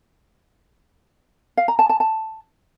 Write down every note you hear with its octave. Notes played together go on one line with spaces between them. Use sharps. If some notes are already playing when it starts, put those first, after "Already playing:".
F5
A#5
A5
A5
A5